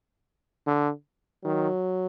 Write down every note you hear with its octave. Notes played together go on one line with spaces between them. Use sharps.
D3
D#3 F#3